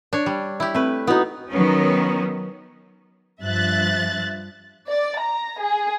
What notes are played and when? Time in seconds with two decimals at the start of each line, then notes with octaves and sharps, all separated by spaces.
0.13 D4 C#5
0.26 G3
0.60 E4 G4
0.75 A3 C4 B4
1.07 B3 D#4 E4 F#4 B4
1.50 D#3 F#3 B3 C#4
3.42 G2 F3 E5 F#6 A6
4.88 D5
5.19 A#5
5.58 G#4